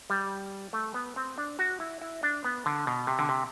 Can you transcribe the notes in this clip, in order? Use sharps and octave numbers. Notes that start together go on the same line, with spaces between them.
G3
A3
B3
C4
D4
F#4
E4
E4
D4
B3
D3
B2
C3
D3
C3